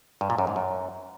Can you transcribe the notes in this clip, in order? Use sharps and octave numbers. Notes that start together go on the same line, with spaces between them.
G2
A#2
F#2
G#2
F#2